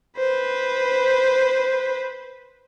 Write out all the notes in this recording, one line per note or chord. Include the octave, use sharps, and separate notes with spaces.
B4 C5